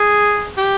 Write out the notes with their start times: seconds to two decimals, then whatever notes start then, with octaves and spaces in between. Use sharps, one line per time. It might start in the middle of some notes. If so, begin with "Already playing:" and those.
Already playing: G#4
0.57 G4